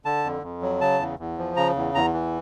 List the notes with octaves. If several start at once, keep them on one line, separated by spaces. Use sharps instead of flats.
D3 A5
F2
F2
F#3
C#3 A5
E2
E2
F3
C#3 A#5
E2
E2 A#5
E3